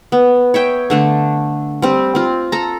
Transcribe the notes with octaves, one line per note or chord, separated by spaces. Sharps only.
B3
C#5 E5 G5
D3 A3 D4
G3 C4
C4 F4
A4 A#5